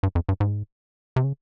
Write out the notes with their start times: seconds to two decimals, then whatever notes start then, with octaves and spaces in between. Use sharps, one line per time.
0.03 G2
0.15 F2
0.29 G2
0.40 G#2
1.16 C3
1.24 C#3